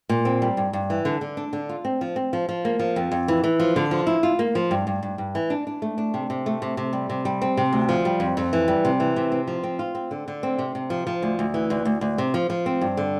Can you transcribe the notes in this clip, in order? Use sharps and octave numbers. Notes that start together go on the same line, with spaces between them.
A#2
C4
G3
G2
G2
E3
D3
D3
D4
D3
F4
C4
F3
C4
F3
F3
A#3
F3
F2
F2
E3
E3
F3
D3
F3
E4
F4
A#3
F3
G2
G2
G2
G2
E3
D4
D4
A3
D4
C3
C3
A3
C3
C3
G3
C3
G3
C4
C3
D2
F3
G3
F2
F2
E3
G3
C3
E3
C3
C4
F3
C4
F4
C4
D3
D3
C4
C3
C3
F3
F3
D2
D2
E3
D2
D2
D2
C3
F3
F3
C4
G2
D3